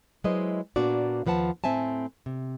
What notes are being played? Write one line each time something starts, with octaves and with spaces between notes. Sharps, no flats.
F#3 G#3 E4 B4 C5 D#5
A#2 A#3 B3 D4 F#4 D5
D#2 F3 B4 F#5 A5
A2 C4 E5 G#5 A5
C3